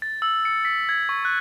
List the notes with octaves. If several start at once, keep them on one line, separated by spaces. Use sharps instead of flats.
A6
E6
C#7
B6
G#6
C#6
F#6